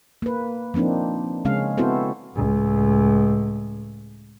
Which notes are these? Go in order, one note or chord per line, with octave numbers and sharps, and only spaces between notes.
A#3 B4
F3 A#3 C4 D4 D#4
C#3 G#3 C#4 F5
B3 C4 E4 F#4 A4 C5
C#2 A2